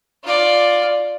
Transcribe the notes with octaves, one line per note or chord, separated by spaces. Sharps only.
F4 D5